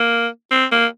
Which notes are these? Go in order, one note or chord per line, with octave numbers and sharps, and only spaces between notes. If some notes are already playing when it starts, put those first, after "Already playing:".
Already playing: A#3
C4
A#3